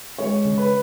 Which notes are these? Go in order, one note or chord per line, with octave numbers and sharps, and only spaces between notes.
G#3 C#5
C#3
B4